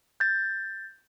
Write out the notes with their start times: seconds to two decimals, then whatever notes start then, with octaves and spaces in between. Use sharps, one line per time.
0.20 G6 A6